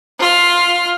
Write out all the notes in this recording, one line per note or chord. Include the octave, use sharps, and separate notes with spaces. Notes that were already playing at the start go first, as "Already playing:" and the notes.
F4 F6